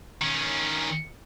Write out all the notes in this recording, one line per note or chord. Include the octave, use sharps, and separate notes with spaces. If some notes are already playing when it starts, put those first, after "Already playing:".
D#3 C#4